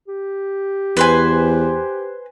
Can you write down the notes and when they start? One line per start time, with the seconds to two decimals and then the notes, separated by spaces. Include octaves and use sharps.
0.08 G4
0.97 E2 B4 C5 G#5